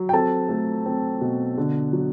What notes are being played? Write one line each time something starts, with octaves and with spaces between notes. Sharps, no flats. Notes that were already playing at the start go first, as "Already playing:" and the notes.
Already playing: F#3
G5
C4 A4 A5
A3
C4
B2
D3
F#3